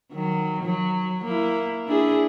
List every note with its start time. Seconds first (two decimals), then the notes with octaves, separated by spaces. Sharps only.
0.12 D#3 F#3
0.64 F#3
1.24 A#3 E4
1.87 D4 E4 G#4